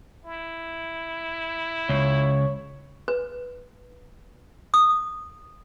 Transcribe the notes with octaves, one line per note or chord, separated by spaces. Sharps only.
E4
C#2 C#5
B4
D#6